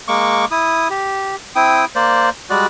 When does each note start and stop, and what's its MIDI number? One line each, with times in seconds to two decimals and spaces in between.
0.08 0.45 56
0.08 0.45 58
0.08 0.45 85
0.08 0.45 86
0.51 0.88 64
0.51 0.88 87
0.90 1.36 67
1.56 1.85 60
1.56 1.85 64
1.56 1.85 79
1.56 1.85 87
1.95 2.30 58
1.95 2.30 72
1.95 2.30 74
2.50 2.67 55
2.50 2.67 56
2.50 2.67 66
2.50 2.67 74